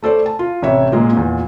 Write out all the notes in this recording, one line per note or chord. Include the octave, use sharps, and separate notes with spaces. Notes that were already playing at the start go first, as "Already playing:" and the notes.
A3 A4 C5 D5
A5
F4
A1 C3 C#5 E5
A#2 G#3 A#3
E2 A#2